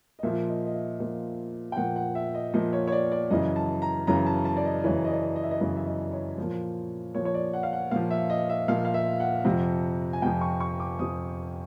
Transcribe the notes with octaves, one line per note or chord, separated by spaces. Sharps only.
D#5
A#2 F3 E5
D#5
D#5
E5
A#2 F3
G5
A#2 F3 F#5
F#5
E5
D#5
A#2 F3 D#5
C#5
C#5
D5
D5
F#2 C#3 E3 D#5
A5
A#5
F#2 C#3 E3 A#5
A5
A5
D5
D#5
F#2 C#3 E3 C#5
D#5
D5
D#5
E5
D#5
F#2 C#3 E3 D#5
E5
D#5
C#5
A#2 F3
A#2 F3 C#5
C#5
D5
F#5
F5
F#5
A#2 F3 F5
E5
D#5
E5
A#2 F3 F5
F5
E5
F#5
F2 C3 F3
G#5
F2 C3 F3 G5
C#6
C#6
D6
F2 C3 F3 D#6